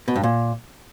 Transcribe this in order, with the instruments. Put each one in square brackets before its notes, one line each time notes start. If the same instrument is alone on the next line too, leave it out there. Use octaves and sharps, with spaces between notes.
[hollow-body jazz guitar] B2
G2
A#2